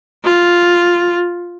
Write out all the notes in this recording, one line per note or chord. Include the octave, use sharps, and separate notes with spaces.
F4